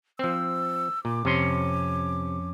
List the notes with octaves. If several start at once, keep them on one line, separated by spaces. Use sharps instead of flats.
F3 C4 E6
A#2 D6
F2 C3 C#4 C6